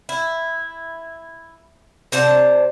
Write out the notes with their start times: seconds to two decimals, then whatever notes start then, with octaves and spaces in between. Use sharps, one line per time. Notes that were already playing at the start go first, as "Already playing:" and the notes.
0.09 E4
2.12 C3 C5 D5 A5